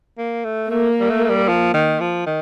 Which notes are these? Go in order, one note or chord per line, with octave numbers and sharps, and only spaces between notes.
A#3
A3
A3 A#3
G3
A3
A3
G3
F3
D#3
F3
D#3